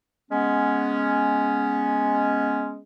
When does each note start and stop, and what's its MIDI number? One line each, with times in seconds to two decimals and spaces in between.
0.31 2.79 56
0.31 2.79 59
0.31 2.79 61